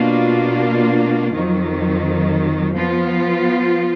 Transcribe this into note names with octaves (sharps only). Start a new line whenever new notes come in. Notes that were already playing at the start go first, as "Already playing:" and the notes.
Already playing: B2 A#3 D4 F4
F2 D#3 F#3
F3 B3 F4